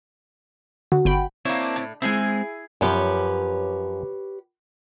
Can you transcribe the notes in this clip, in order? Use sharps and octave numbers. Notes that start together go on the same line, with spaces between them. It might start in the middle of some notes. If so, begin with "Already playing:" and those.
D3 F#4
G1 G5 B5
A#3 C4 D4 E4 C#5
A2
G#3 C4 E4 G#4 G#5
F#2 F3 G4 B4 C#5